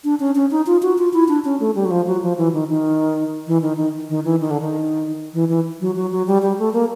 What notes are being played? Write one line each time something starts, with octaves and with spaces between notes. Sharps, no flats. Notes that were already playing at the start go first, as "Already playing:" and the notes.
D4
C#4
C#4
D#4
F4
F#4
F4
E4
D4
C#4
A3
G3
F#3
F3
F#3
F3
E3
D#3
D#3
E3
D#3
D#3
D#3
E3
D#3
D3
D#3
E3
E3
F#3
F#3
F#3
G3
G3
A3
A#3